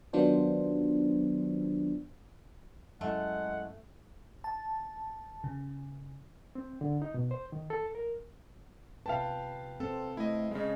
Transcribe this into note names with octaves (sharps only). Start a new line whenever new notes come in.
D#3 F#3 B3 D4 F4 C5
F#2 G#3 A3 E4 F#5
A5
C#3
C4
D3
D#4
B2
C5
D#3
A4
A#4
C3 F4 B4 F5 G5 A5
C4 A4
A3 E4 D#5
C#3 G#3 D#5